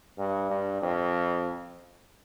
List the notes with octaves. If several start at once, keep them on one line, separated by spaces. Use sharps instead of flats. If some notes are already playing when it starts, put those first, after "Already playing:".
G2
G2
F2